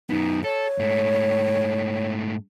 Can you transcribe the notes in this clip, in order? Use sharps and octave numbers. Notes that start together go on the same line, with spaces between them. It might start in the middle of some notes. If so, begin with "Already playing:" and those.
F#2 B3 D#4
A4 C#5
G#2 A3